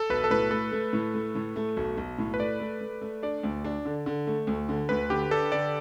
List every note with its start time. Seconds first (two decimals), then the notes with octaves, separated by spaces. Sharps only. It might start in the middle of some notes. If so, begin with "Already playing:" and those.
Already playing: A4
0.10 B1 B4
0.24 A4
0.30 A2 B4
0.51 A3 A4
0.72 A3
0.93 A2
1.14 A3
1.35 A2
1.56 A3
1.77 B1
1.98 B1
2.18 A2
2.34 B4
2.39 A3 D5
2.60 A3
2.81 A3
3.01 A3
3.23 D4 D5
3.43 D2
3.64 D4
3.85 D3
4.06 D3
4.27 A3
4.47 D2
4.69 D3
4.89 D2 B4
5.10 D3 G4
5.31 D4 A4
5.52 D3 D5